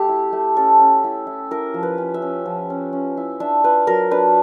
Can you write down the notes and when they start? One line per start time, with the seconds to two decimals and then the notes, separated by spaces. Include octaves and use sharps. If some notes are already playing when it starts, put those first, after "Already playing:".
Already playing: A3 G4
0.09 E4
0.33 A3
0.56 C#4 A4
0.80 C#4
1.04 E4
1.27 E4
1.51 E4 A#4
1.74 F3
1.83 B4
1.98 C#4
2.14 E5
2.22 C#4
2.46 F3
2.70 C#4
2.93 C#4
3.17 E4
3.40 D4 E5
3.64 F4 B4
3.87 F#3 A#4
4.11 D4 B4